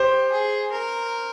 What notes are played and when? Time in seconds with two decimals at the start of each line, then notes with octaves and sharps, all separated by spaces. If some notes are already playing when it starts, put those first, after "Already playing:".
Already playing: G4 C5
0.32 G#4
0.72 A#4